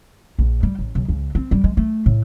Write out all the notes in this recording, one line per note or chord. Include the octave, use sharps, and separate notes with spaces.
A#1
G3
A1
B1
C#2
C4
G3
G#3
A3
A2